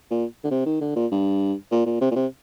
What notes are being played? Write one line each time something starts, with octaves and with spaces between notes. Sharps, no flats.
A#2
D3
C3
D#3
D3
A#2
G2
A#2
A#2
C3
A#2
C3